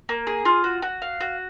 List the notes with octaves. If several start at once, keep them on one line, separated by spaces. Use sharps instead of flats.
A#3
G#4
F4
F#4
F#4
F5
F#4